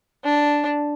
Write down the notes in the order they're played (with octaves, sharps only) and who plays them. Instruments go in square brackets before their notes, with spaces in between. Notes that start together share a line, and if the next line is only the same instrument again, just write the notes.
[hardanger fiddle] D4